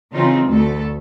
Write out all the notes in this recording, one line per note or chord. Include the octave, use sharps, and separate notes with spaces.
C#3 E3 C4 D#4 F4
D2 A3 A4